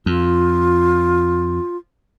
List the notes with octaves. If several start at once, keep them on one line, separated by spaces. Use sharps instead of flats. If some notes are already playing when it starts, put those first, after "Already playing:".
F2 F4